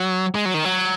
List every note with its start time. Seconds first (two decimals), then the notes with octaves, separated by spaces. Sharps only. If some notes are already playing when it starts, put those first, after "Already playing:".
Already playing: F#3
0.35 G#3
0.45 F#3
0.54 D#3
0.65 F#3